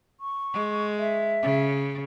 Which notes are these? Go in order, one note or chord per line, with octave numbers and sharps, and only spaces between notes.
C#6
G#3
E5
C#3